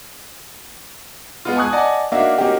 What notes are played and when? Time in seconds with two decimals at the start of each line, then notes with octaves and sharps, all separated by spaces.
1.45 G#3 B3 F4
1.56 G#5 A5 C#6 D#6 F#6 G#6
1.72 D5 D#5 F#5 G#5 A5
2.12 A#3 D4 D#4 F#4 E5 F5
2.38 A#3 C#4 D#4 F#4 G4